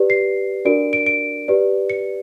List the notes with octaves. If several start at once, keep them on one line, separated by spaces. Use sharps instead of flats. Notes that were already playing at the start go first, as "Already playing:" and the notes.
Already playing: G4 B4 D5
C7
D4 F#4 A#4 D5 D7
D7
D7
G4 B4 D5
C#7